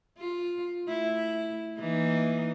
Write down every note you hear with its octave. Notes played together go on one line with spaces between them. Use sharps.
F4
A3 E4
E3 A#3 D#4